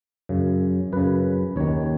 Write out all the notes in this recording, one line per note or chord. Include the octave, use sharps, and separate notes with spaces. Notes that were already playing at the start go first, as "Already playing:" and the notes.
F#2 C#3
F#2 C#3 B4
D#2 D#3 C#5